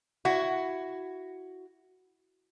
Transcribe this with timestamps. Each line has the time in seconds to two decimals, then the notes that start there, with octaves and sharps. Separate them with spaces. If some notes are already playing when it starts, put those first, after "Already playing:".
0.25 E4 F#4